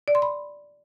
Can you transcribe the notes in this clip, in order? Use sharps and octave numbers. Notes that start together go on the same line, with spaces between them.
D5
C6
B5